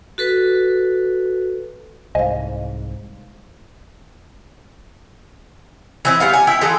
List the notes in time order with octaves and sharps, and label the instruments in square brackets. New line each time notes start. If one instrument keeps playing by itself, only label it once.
[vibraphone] F#4 A4 B4
[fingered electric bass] C2 G#2 [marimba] C5 F5 [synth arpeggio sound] D#5 G#5
[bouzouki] E3 C4 E4
G3 B3 F5
G#5
E4 E5 G5
E3 G#3 F4 A4